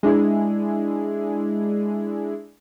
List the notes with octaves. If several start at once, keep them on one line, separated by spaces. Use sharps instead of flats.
G#3 D4 E4 G#4